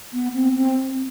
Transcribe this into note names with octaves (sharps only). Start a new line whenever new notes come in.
B3
C4
C4